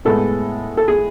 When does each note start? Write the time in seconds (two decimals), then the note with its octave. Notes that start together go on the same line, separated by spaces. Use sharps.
0.05 A2 G#3 B3 A4
0.77 A4
0.88 G#4